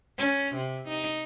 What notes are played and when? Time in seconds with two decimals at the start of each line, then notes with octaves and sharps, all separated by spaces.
0.18 C#4
0.56 C3
0.88 D#4